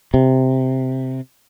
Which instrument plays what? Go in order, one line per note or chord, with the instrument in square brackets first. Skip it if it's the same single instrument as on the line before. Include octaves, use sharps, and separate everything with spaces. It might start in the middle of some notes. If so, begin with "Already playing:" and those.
[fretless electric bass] C3